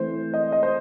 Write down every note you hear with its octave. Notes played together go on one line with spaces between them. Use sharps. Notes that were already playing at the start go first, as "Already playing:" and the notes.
Already playing: E3 A3 C4 C5
D#5
D#5
C5